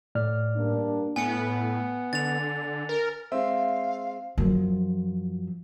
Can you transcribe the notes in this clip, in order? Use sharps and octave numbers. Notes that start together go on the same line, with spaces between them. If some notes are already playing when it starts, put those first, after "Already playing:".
A2 D5 F6
G2 A#3 D4
A2 B3 G#5 C#7
D3 A6 F7
A#4
G#3 C4 E5 F5
F#2 F3